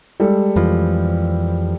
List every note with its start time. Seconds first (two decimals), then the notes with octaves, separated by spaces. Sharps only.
0.20 G3 G#3 A4
0.56 F2 E3 F3